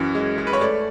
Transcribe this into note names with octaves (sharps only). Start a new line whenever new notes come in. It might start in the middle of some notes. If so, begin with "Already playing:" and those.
Already playing: F#2 E3
G#3
G#3
B4
C#5
A3 D5